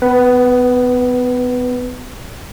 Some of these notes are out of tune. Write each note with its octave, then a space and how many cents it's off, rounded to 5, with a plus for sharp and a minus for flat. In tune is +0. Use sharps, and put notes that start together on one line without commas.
B3 +30 B4 +0